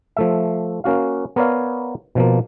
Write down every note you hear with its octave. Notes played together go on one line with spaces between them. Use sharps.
F3 A3 E5
A#3 C#4 F#4 F5
B3 A#4 B4 C#5 D5 F5
B2 F3 A#3